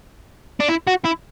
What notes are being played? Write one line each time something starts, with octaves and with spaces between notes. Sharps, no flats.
D4
E4
F#4
E4